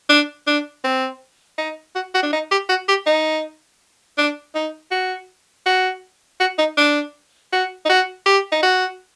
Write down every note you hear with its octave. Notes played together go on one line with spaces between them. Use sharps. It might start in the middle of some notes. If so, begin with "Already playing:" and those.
D4
D4
C4
D#4
F#4
F#4
D4
D#4
G4
F#4
G4
D#4
D4
D#4
F#4
F#4
F#4
D#4
D4
F#4
D#4
F#4
G4
D#4
F#4